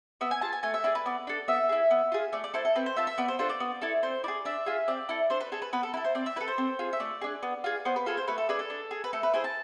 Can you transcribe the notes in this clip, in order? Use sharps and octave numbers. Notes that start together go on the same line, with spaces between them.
B3 E5
G#5
F4 G#4 A5
G#5
A3 G#5
E5
E4 G#4 D5
B4
B3 D5
D4 A4
B3 E5
E4 G#4
B3
F4 G#4
A3 D5
D5
E4 A4 C5
A4
C4 B4
C5
F4 A4 E5
E5
B3 D5
C5
D4 F4 A4 C5
D5
B3
E4 A4
C4 C5
E4 G#4 D5
D4 E5
F4 G#4
C4 D5
E4 A4
D4 C5
B4
G#4 A4
B4
B3 B4
A4
E4 A4 B4
C5
C4 D5
E5
E4 A4 B4
C5
C4
F4 G#4
E5
A3 D5
D4 G#4
B3
F4 G#4
B3 C5
B4
F4 G#4 A4
C5
A3 B4
A4
D4 G#4 B4
A4
D4
G#4
B4
A3 A4
B4
E4 G#4 C5
A5